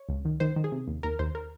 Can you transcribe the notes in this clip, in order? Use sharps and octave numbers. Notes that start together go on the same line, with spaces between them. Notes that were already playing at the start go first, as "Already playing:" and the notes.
Already playing: C#5
C#2
D#3
D#3 C5
D#3
G#4
C3
D#2
D#2 A#4
D#2 C5
A#4